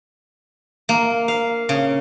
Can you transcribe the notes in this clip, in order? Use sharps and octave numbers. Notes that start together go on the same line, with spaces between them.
A#3
F5
C#3